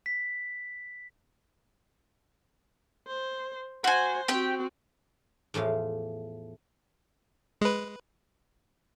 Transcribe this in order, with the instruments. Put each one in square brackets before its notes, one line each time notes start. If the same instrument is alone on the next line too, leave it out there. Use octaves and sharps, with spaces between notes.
[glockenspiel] B6
[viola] C5
[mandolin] F#4 G#5 [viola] C5
[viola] C4 F#4 [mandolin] G4 G5
[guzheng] E2 A2 F3 F5
[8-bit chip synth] G#3 B4